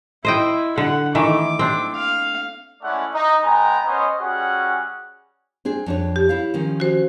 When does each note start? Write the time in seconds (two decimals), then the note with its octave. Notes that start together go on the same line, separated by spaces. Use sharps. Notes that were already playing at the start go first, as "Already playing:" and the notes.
0.25 E4 C5 D#5 G5
0.78 D3 F#5
1.15 D#3 E3 A3 D6
1.59 C4 D4
1.94 F5
2.82 G#3 A3 C#4 E4 D5 F#5
3.14 D#4
3.44 G#3 B3 G5 G#5 A#5
3.86 B3 C#4 C5 C#5 D#5
4.19 G3 C#4 F#4 G#4 F#5
5.65 C4 D4 G#4
5.86 F2 D4 C#5
6.16 G4
6.29 E4 C#5 F5
6.54 D#3 F3 C#4
6.80 F#4 C5